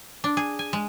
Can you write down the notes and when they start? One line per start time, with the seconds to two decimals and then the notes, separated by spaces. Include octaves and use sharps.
0.24 D4
0.37 G#4
0.59 G#5
0.73 G#3